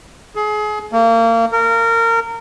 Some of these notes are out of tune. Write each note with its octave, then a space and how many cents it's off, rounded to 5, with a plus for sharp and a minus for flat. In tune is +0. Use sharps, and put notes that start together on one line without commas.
G#4 +30
A#3 -30
A#4 -25